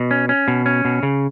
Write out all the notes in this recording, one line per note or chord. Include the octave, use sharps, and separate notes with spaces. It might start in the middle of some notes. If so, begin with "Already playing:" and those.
Already playing: B2
C#4
C#4
B2
C#4
B2
C#3